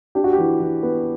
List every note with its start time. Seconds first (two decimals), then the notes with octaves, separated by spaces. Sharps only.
0.15 D4 G4
0.24 F#4
0.33 G4
0.38 E3
0.60 E3
0.83 B3